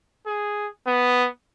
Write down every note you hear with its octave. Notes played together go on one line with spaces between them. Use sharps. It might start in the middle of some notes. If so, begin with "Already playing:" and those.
G#4
B3